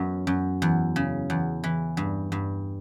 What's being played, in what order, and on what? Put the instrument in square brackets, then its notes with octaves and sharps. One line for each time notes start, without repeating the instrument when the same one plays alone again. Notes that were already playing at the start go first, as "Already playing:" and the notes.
Already playing: [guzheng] F#2 B3
F#2
E2
C#3
E2
E3
G2
G2